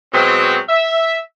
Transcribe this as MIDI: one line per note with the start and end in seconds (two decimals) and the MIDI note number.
0.13 0.59 47
0.13 0.59 54
0.13 0.59 56
0.13 0.59 60
0.69 1.17 76